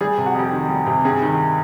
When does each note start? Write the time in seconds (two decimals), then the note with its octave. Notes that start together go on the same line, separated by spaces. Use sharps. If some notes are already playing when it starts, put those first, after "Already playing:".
0.01 G3 G#4
0.18 C3
0.26 F#4
0.35 F2 G4
0.52 D#3
0.69 G3
0.87 C3
1.05 G2 G#4
1.22 D#3